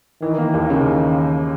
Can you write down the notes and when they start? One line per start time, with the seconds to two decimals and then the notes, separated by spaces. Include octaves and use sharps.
0.22 D#3 E3
0.38 A#3
0.54 D#2
0.70 C#3